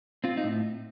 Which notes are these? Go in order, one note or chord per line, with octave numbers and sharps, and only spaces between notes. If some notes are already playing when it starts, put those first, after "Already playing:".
C4 F4
D#4
A2